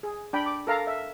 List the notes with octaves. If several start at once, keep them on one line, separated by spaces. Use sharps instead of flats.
G#4
D4 G5 B5
D6
A4 A#4 F5 A#5
E5